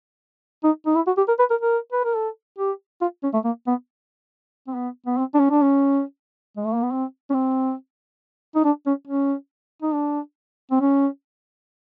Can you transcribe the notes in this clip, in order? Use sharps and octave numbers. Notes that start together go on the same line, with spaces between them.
D#4
D#4
E4
F#4
G4
A#4
B4
A#4
A#4
B4
A#4
A4
G4
F4
C#4
A3
A#3
B3
C4
B3
B3
C4
D4
C#4
D4
C#4
G#3
A3
A#3
B3
C4
C#4
C4
D#4
D4
C#4
C#4
D#4
D4
C4
C#4